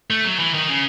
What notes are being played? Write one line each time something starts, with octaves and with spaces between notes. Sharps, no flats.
A3
F#3
E3
D#3
C#3